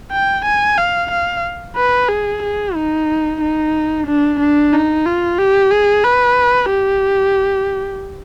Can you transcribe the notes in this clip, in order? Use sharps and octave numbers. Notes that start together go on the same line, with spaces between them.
G5
G#5
F5
F5
B4
G#4
G#4
D#4
D#4
D4
D4
D#4
F4
G4
G#4
B4
G4